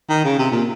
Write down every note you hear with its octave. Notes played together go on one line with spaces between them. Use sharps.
D#3
C#3
C3
A#2